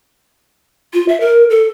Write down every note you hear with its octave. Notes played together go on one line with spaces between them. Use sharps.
F4
E5
A#4
A4